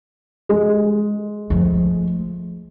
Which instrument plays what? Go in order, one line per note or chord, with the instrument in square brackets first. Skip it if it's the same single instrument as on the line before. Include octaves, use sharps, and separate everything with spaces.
[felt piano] G#3
[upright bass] F3 A3